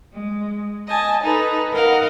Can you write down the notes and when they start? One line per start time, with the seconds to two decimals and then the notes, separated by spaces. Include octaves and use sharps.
0.12 G#3
0.87 D#5 G#5 A5
1.23 D#4 A4 B4
1.73 A#4 D#5 F5 F#5